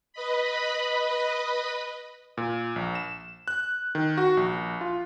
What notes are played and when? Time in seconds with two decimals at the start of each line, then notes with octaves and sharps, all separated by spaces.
0.13 B4 D#5 B5
2.37 A#2
2.76 A#1
2.95 E7
3.48 F#6
3.95 D#3
4.18 F#4
4.37 A#1
4.81 F4